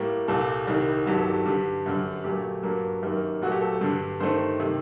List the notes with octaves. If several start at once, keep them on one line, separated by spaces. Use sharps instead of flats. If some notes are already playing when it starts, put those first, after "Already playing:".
Already playing: A2 G3 A#3
C2 A#2 G3 A4
C2 C3 D#3 G3
G2 D#3 F#3 G4
A4
G4
G2 D3 G3 G4
F#2 D3 G3
A#2 F#3 A3 G4
G2 F#3 A#3
F#2 D#3 G3 A#3
A#2 F#3 A3 F#4
G4
A4
G2 D3 G3
G2 D#3 A3 C5
C3 D#3